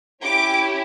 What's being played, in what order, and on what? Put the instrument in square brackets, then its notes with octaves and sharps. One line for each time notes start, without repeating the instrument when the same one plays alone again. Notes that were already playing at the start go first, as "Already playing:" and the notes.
[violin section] C#4 E4 G4 D6